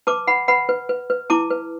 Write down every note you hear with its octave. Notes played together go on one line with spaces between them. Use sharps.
B4 A5 D6
B4 F#5 B5
B4 F#5 B5
B4
B4
B4
E4 A5 D6
B4